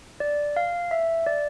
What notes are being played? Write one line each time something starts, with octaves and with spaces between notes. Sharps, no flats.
D5
F5
E5
D5